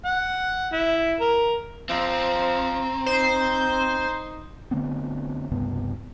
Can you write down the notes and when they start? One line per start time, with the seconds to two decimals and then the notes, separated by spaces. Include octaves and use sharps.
0.05 F#5
0.73 E4
1.20 A#4
1.89 F3 C4 A#5
3.06 D#4 C5
4.71 D3 A3 B3 C4
5.52 C#2 G2 C3 B3